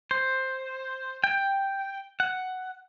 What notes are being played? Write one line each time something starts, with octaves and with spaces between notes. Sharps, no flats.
C5
G5
F#5